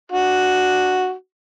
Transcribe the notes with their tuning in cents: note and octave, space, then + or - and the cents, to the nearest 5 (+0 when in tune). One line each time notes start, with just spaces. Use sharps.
D4 +5 F#4 +0